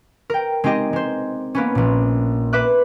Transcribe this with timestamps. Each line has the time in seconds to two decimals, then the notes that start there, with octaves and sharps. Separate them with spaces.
0.30 A#4 G5
0.64 G#3 C4 D#4 G4 D#5
0.93 G#3 C5
1.55 A#3 B3 C#4
1.75 A#1 A#2
2.53 B4 E5 D6 F#6